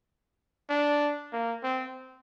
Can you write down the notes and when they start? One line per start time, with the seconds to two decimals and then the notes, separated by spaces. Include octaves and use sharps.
0.70 D4
1.33 A#3
1.63 C4